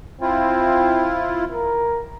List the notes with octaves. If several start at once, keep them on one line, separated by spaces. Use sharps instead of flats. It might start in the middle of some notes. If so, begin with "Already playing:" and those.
C4 E4 F4
A#4